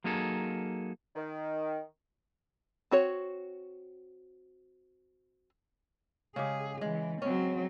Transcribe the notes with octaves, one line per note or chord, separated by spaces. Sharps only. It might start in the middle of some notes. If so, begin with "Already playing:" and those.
F#3 A#3 D#4 G#4 A4
D#3
C4 F#4 C#5
C#3 G#3 G4 G#4
E3 G#3
F#3 C4 C#4